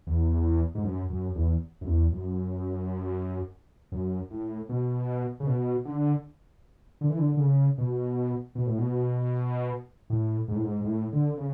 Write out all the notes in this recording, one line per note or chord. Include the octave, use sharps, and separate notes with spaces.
E2
G#2
F#2
F#2
E2
F#2
E2
F#2
F#2
A2
B2
C#3
B2
D3
D3
E3
D3
D3
C#3
B2
B2
A2
B2
A2
G#2
A2
G#2
G#2
A2
D3
C#3